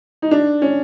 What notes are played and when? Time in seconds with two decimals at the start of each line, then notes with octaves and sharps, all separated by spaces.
0.22 D#4
0.31 D4
0.62 C#4